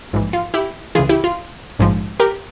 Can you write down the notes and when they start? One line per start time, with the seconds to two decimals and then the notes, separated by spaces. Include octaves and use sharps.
0.13 A#1 G#2 E3
0.33 F4
0.54 E4 G4
0.95 C#2 C#3 E3 F4 G#4
1.09 E4 G4
1.24 F4
1.79 A#1 G#2 F3
2.20 G4 A#4